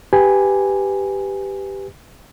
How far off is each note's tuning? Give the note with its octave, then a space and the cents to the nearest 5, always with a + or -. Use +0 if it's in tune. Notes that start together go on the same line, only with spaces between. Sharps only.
G4 +0 B4 +10 G#5 +0